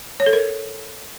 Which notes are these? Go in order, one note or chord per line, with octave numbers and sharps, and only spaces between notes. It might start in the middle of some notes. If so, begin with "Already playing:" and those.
C#5
A4
A#4